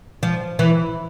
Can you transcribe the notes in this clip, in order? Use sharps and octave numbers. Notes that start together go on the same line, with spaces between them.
F3
E3